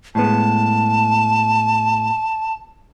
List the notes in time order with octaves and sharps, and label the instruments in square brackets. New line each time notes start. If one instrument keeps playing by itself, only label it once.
[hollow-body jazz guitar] A2 G#3 B3 [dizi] A5